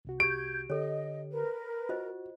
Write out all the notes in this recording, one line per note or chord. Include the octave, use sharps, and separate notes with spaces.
C2 C3 F#4
G4 G6 G#6 D7
D3 G4 A4 C#5 D#5
A#4 B4
F4 F#4 C5 D#5